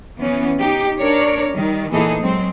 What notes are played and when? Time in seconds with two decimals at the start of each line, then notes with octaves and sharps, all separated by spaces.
0.20 E3 B3 C#4
0.59 D#4 G4
0.99 D4 A#4 C#5 D5
1.51 D#3 G3
1.91 A#2 E3 B3 D#4 G#4 A4
2.21 F#3 G#3 C4